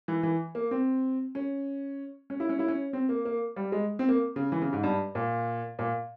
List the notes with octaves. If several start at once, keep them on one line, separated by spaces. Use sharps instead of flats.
E3
E3
A#3
C4
C#4
C#4
E4
C#4
E4
C#4
C4
A#3
A#3
G3
G#3
C4
A#3
C#3
E3
C#3
G#2
G2
A#2
A#2